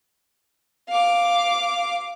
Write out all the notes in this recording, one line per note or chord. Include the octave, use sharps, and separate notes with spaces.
F5 D6